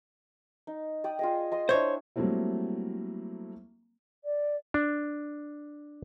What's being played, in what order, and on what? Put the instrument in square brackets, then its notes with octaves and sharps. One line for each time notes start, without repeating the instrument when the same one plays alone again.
[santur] D#4
D5 G5 D#6
F4 G#4 D#5
D#5 C6 D#6
[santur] D4 E4 [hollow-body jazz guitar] C5 C#5
[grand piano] F#3 G3 A3 A#3 C4 E4
[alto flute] D5
[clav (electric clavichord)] D4